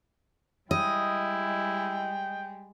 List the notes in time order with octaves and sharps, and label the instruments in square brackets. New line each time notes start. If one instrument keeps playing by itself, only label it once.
[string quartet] G3 G#3 [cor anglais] E4 [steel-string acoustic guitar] D#5 [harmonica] G5